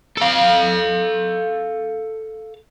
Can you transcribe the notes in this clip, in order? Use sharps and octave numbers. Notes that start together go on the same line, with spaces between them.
A4 F5